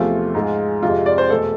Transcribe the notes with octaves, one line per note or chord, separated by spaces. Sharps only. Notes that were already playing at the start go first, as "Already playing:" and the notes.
Already playing: E2 C3 F3 A3 F4
G#2 G#3
F2 C3 G#3 F4
D5
C5
E2 B2 A3 A4